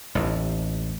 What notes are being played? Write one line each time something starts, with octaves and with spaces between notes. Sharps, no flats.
A1 D#2